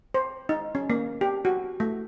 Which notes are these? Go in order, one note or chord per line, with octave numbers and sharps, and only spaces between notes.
C5
D#4
C#4
A#3
G4
F#4
A3